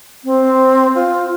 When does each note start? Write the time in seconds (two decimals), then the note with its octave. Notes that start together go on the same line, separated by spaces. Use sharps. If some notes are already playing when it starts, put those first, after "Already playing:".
0.25 C4
0.95 F4